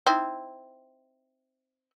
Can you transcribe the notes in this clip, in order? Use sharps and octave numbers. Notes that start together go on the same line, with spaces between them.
C4 D#4 E4